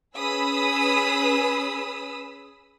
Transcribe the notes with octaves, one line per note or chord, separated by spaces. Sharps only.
C#4 G#4 B4 B5 D#6 E6